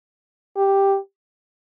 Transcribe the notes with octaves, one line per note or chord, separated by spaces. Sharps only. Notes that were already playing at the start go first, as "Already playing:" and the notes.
G4